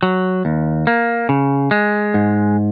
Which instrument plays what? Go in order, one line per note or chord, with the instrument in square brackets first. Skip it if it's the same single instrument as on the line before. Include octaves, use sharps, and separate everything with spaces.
[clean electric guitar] F#3
D#2
A#3
C#3
G#3
G#2